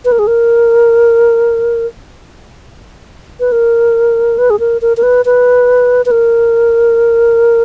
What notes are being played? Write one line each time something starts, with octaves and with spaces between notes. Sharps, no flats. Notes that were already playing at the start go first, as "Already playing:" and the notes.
B4
A#4
G#4
A#4
B4
A#4
B4
G#4
A#4
A#4
A#4
B4
B4
B4
A#4